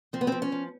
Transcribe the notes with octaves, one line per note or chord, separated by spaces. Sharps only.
F3 C4
B3
F3 C4
C#4
F3